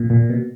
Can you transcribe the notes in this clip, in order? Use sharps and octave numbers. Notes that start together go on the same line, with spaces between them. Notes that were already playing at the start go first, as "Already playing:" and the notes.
Already playing: A#2
A#2
B2